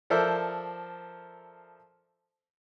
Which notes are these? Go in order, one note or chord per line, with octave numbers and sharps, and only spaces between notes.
F3 A4 A#4 C5 D5 E5